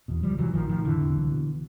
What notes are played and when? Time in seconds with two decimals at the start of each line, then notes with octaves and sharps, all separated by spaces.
0.08 E2 B2
0.23 C#2 F3 G3
0.38 C3 E3 F#3
0.54 A1 D#3 F3
0.69 A2 D#3 F3
0.84 F1 D3 E3
1.00 E2 C3
1.16 C2
1.31 B2